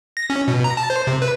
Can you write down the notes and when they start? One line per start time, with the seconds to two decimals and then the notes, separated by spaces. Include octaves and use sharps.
0.17 A#6
0.30 C#4
0.48 B2
0.64 A#5
0.77 A5
0.90 C5
1.07 C3
1.22 B4